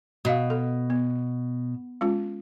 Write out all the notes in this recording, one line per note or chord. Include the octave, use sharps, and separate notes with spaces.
B2 F#4 D#5 F5
A4
B3
G#3 C#4 F4